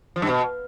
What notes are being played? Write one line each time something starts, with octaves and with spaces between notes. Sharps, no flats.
F3
G2
B2